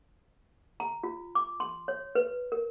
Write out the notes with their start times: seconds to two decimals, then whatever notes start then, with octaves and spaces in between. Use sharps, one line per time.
0.80 A#5
1.03 F4
1.35 D6
1.60 C6
1.88 C#5
2.15 B4
2.52 A#4